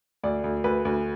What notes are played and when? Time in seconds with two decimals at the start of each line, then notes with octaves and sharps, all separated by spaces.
0.23 D2 D5
0.44 D2
0.64 D2 B4
0.85 D2